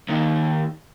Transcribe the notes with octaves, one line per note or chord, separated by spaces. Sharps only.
D#2 D#3